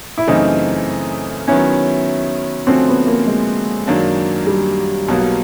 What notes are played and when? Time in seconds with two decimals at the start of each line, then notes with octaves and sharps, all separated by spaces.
0.18 E4
0.27 F#2 C#3 E3 A3 C4 D#4
1.48 D#3 F#3 B3 C#4 E4
2.67 D3 F3 A3 C4 C#4 F#4
2.88 B3
3.07 A#3
3.27 G#3
3.87 F#2 D#3 F#3 A#3 D4
4.47 G3
5.08 B1 B2 F#3 A#3